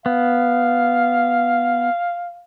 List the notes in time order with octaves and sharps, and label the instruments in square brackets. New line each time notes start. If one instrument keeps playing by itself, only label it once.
[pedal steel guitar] B3 [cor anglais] F5